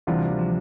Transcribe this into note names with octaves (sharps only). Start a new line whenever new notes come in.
D2 C3 E3 G3 D4 F4
F3